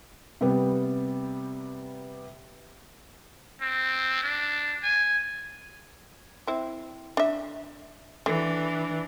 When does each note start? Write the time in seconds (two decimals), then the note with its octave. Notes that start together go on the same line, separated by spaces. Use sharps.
0.41 C3 G3 B3
3.61 C4
4.23 D4
4.83 G#5
6.47 C4 E4
7.17 D4 E5
8.26 D3 E3 F#3 D4